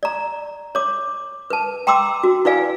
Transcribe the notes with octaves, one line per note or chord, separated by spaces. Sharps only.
D5 A#5
C#5 D6
B4 A5
G5 A#5 C6 D6 E6
F#4
E4 B4 D5 F5 G#5